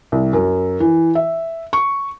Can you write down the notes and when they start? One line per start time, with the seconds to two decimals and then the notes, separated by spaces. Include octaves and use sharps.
0.12 C2
0.33 F#2
0.80 E3
1.15 E5
1.73 C#6